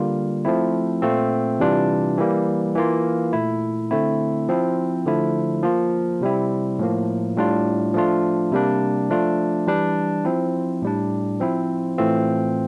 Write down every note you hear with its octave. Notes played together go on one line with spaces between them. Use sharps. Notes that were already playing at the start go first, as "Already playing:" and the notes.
Already playing: D3 G3 A#3 F4
F3 A3 C4 E4
A#2 A3 C4 F4
C3 E3 G3 D4 F4
E3 G3 A#3
E3 A#3 F4
A#2 A3 E4
D3 A3 C4 E4
F3 C4 E4
D3 F3 A3 E4
F3 A#3 F4
C3 G3 C4 E4
A2 F3 A#3
A2 G3 D4 F4
F3 A3 D4 F4
C3 G3 A#3 D4
F3 A3 D4 F4
E3 G3 D4
F3 C4 E4
A2 G3 D4
F3 C4 E4
A2 E3 A3 C4 F4